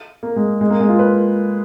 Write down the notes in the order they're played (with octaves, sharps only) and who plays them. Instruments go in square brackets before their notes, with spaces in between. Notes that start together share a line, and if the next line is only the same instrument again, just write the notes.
[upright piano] A#3
G#3
G#3
A#3
G#3
F4
B4